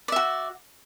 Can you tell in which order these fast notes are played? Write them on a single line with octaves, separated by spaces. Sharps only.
D5 E5 F#4